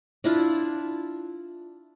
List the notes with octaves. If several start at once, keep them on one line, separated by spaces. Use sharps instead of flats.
D4 E4 F4